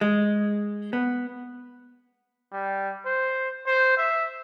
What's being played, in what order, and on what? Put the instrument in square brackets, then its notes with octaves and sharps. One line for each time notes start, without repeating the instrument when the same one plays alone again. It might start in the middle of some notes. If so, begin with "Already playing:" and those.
[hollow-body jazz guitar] G#3
B3
[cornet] G3
C5
C5
E5